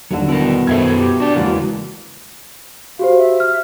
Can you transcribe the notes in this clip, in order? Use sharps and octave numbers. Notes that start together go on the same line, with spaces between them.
D#1 D#2 D3 F#3
B2 D#3 E4 A#4
F#2 D#3 E4 A4 C5 E5 G#6
G4
D4 F#4 D5
E1 C#3 E3 G#3 A#3 F#4
F#4 G4 C5 F5
E5
F6